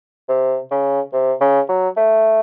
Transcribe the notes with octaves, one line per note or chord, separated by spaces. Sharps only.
C3
C#3
C3
C#3
F#3
A3